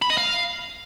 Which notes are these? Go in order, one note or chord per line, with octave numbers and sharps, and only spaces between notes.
B5
D#5
F5